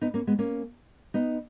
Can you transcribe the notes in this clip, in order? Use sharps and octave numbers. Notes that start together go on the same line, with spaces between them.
B3 D#4
A#3 C#4
G#3 B3
A#3 C#4
B3 D#4